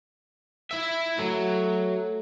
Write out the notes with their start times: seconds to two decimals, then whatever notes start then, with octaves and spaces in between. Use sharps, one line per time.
0.71 E4 E5
1.18 F#3 A3